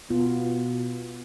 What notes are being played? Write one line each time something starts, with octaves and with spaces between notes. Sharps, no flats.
B2 B3 F4